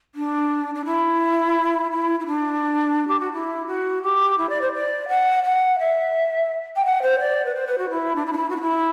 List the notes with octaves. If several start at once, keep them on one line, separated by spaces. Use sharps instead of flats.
D4
D4
E4
E4
E4
D4
G4
F#4
E4
F#4
G4
E4
D5
C5
D5
F#5
F#5
E5
G5
F#5
C5
D5
B4
C5
B4
F#4
E4
D4
E4
D4
E4
F#4
D4
E4